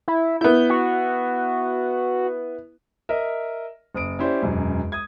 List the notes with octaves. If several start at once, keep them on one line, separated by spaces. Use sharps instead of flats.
E4
B3 E4 G6
F#4
A#4 D#5 E5
F#1 D#6 D7
C#4 E4 G4 C5 D5
E1 F#2
D#6 G#6